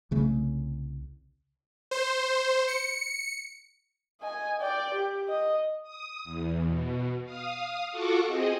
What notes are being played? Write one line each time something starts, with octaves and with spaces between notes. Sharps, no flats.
C2 C#3 A3
C5
C#7
D#5 G#5
D5 G5
G4
D#5
D#6
E2
B2
F5 D#6
F4 F#4 A4 F#5 C#6 D6
C4 G#4 D#5